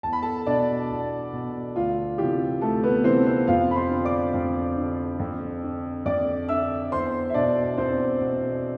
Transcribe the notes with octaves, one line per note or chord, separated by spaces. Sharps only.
E2 A5
B5
A4 A5
B2 D4 D5
E2
B2
D2 F4
C3 E3 G4
D2 A3 A4
B3 B4
C3 E3 C4 C5
C4 C5
F2 F4 F5
B5
C5 C6
D3
D5 D6
F2
D3
F2
D3
F2 D5 D6
D3 E5 E6
E2 C5 C6
E5
B2 D4 D5
E2 C4 C5
B2